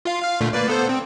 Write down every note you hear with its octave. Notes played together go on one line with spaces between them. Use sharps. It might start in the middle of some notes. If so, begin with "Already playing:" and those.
F4 F5
F5 F6
A#2 D3 A3
A#3 B4 D5
B3 A4 C5
C4